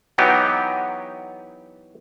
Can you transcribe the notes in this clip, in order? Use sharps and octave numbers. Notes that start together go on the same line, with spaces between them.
E3 F#3 B3 D#4 G4